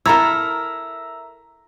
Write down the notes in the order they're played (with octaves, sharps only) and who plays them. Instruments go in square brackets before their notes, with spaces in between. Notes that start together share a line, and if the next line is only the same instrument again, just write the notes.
[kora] E4 A4 A#4 [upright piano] E5 A#5 [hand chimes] E6